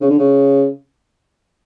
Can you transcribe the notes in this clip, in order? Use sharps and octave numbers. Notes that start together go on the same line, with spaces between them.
C#3
D3
C#3